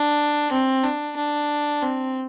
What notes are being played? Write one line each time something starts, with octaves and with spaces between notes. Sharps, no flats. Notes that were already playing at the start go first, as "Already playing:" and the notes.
Already playing: D4
C4
D4
D4
C4